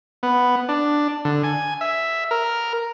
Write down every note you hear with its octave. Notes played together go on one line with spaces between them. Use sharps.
B3
D4
D3
G#5
E5
A#4